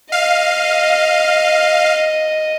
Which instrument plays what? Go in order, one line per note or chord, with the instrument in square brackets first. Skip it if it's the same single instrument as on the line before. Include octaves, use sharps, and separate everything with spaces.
[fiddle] D#5 [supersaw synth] F5